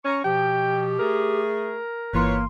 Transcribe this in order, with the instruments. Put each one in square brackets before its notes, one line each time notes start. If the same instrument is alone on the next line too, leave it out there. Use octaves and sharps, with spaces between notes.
[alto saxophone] C#4 [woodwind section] A#5 C#6
[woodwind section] B2 F3 [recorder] G4 [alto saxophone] G5
[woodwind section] A3 G#4 [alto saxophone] A#4
[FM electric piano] G1 E3 C6 [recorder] A#3 [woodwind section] F4 B4 C#5